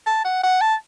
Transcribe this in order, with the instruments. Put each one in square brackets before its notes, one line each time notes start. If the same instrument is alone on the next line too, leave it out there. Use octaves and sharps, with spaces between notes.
[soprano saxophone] A5
F#5
F#5
A5